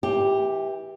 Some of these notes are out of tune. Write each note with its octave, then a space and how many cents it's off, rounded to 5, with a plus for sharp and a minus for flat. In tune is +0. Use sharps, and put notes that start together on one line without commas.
E3 -20 G4 +0